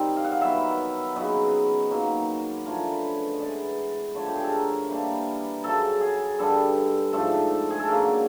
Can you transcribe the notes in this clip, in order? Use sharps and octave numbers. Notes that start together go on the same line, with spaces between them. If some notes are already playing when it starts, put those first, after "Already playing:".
Already playing: D#3 G3 C4 D#4
F5
F#5
F5
D#3 F#3 B3 E5
C#3 F#3 B3 D#4 D#5
D#3 F#3 A#3
D3 F3 A3 C#4 A#4
B4
D#5
E3 G#3 B3 D5
D3 F3 A3 C#5
G4
G#4
A4
A#4
E3 G3 A#3 D4
F#2 C#3 F#3 A4
G#4
G2 D3 G3 A4
G#2 F3 A3 D4 A4
G#4
A4
C#3 F#3 A#3 D4 A#4